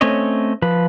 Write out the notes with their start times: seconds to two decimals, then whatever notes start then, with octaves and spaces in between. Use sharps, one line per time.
0.01 A3 C4 C#4 C#5 D#5
0.62 F3 B4 B5